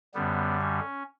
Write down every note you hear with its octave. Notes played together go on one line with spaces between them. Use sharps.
F#2 D3 G3 B3
C#4